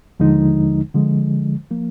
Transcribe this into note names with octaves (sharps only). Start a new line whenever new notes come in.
D#2 D3 F3 G#3 D#4
D3 F3 G#3
F3 A#3